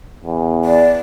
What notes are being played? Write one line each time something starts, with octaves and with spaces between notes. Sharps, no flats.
E2
D5